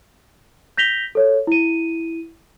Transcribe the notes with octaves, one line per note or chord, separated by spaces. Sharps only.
G6 A#6 B6 F7 G7
A4 C#5
E4 D#7